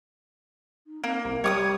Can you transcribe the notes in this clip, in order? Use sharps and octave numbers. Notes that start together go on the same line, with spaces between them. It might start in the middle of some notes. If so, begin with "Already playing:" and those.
D#4
A#3 C4
C2 A#4
G3 G4 C#5 D6 D#6